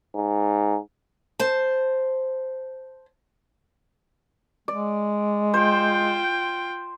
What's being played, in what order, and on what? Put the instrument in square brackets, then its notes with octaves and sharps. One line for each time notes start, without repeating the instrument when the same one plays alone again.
[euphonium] G#2
[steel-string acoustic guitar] C5 A5
[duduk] G#3 [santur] D5
[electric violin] F4 G5 [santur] C5